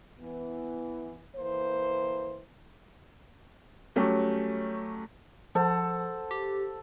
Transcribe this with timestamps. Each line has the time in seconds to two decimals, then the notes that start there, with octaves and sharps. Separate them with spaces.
0.20 E3 B3
1.35 E3 A#3 C5
3.96 F#3 G3 A3 C#4 G4
5.55 F3 A4 C5 F#5
6.31 G4